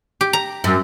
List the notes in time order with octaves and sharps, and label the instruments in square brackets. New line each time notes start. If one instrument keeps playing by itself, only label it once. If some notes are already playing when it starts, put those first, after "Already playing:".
[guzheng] G4
A#5
[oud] F#2